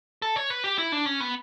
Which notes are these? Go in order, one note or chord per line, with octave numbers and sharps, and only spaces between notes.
A4
C#5
B4
G4
E4
D4
C#4
B3